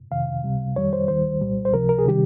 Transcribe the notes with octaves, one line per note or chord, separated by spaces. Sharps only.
F2 C3 D#3 F5
C#2 C3 G3
F2 D#3 G3 C#5
C5
D#2 D#3 G3 C5
C2 A#2 G3
C5
C#2 C3 F3 A#4
A#4
G#4
C3 D#3 G3 G4